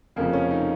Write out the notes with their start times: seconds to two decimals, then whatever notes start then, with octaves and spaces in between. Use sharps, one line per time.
0.16 F1 F2 C#3 F3 A#3
0.33 C#4
0.51 D#4